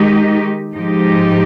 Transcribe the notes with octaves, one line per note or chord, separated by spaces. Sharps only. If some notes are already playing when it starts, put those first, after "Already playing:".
Already playing: D#3 G#3 D#4 G4
G#2 F3 G#3 D#4 G4